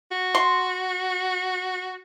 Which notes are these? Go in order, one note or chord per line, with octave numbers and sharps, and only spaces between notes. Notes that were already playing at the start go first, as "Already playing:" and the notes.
F#4
C6